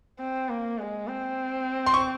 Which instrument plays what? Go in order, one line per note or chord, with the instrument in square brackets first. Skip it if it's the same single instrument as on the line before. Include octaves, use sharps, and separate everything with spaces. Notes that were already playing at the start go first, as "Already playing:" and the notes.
[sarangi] C4
A#3
G#3
C4
[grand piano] C6
C#6